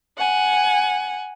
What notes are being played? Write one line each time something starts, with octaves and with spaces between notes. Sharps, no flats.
F#5 G#5